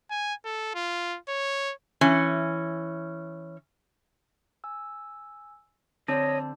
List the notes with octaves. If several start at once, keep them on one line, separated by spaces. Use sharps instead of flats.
G#5
A4
F4
C#5
E3 C#4
G#5 E6
D3 C4 C#5 D#5 A5